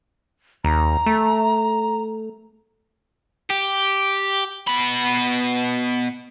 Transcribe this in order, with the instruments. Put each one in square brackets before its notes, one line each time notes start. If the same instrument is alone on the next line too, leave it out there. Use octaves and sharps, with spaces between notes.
[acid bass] D#2 [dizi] A#5
[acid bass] A3
[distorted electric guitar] G4
B2 B5